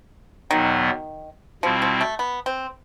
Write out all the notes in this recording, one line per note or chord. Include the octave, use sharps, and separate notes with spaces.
E2 B2 D#3 F#3 B3
B2 F3 G3 C4 E4
F3
A3
B3
C4